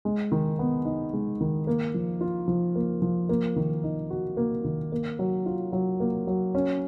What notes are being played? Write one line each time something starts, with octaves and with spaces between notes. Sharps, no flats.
G#3
D#3
B3
D#4
G#3
D#3
A#3
F3
F4
F3
A#3
F3
A#3
D#3
D#4
F#4
A#3
D#3
A#3
F#3
F4
F#3
A#3
F#3
C#4